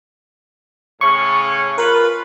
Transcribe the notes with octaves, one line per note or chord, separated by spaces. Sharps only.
A2 C#3 C#4 C#6
F4 A#4 B4